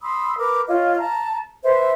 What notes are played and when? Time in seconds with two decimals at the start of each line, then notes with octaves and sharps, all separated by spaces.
0.02 B5 C6 D#6 E6
0.38 A#4 B4 D6
0.67 F4 C#5 D#5
0.98 A5 A#5
1.64 B4 C5 E5